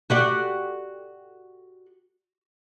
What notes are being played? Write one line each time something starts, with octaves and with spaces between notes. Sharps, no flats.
F#4 G4 D5